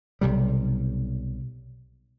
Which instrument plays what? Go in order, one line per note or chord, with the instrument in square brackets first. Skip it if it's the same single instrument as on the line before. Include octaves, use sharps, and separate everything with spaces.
[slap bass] B1 C3 G3